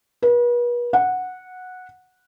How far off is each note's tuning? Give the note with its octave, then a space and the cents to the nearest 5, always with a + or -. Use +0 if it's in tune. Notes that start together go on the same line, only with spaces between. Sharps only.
B4 -40
F#5 -10